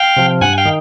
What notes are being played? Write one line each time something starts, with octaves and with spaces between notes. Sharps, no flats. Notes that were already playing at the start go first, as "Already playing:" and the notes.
Already playing: F5 G5
C3 F3
G2 F#5 G#5
F5 G5
D#3